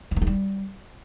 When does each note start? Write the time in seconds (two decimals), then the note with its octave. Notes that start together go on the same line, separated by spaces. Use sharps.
0.11 E3
0.16 A#3
0.22 A3
0.27 G3